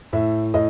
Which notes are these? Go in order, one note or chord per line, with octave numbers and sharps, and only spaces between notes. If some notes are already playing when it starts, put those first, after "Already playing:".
A2 E5
A2 D#5